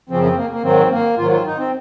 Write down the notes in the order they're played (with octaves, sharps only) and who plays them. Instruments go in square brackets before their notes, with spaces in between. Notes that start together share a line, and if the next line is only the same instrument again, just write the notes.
[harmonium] F#2 C#3 F3 C4
C4
A#3
A#3
G#2 D#3 F#3 C4
A#3
G#2 D#3 F#3 F4
F4
D#4
C4